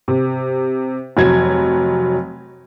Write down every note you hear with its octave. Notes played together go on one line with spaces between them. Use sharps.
C3
F1 F#3 G#6